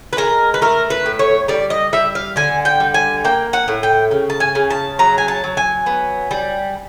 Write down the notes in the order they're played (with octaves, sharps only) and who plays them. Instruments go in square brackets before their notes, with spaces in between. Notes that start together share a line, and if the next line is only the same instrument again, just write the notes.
[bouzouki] B4
G#3 A#4
B4
A3 A#4
B4
A2
C#5
G3 D5
D#5
G3 E5
F5
D3 G#5
G5
G3
G#5
A#3 G5
F#5
A2
G5
C#3
A5
G#5
C#3
A5
F#3 A#5
G#5
A5
F#3
G#5
B3
G3